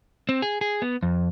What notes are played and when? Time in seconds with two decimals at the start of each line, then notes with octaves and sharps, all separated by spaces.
0.29 C4
0.42 G#4
0.61 G#4
0.82 B3
1.03 F2